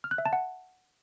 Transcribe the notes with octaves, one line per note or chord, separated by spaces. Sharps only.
F6
F#6
E5
A5
F#5